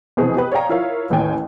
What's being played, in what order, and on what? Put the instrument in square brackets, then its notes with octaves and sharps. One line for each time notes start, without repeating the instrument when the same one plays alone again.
[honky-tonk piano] F1 B2 E3 C4 G#4 D#6
G4 B4
C#5 D5 F5 G5 A#5
E4 F4 A#4 C#5 F5
A1 D#2 A2 C#5 G5 G#5